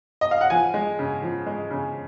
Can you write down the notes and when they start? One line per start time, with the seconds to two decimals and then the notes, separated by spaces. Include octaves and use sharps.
0.21 D#5
0.31 F5
0.41 F#5
0.50 F3 G#5
0.74 G#3
0.99 C#3
1.22 F3
1.47 G#3
1.71 C#3